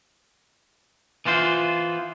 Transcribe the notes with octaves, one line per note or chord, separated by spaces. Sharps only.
E3 B3 F4 C5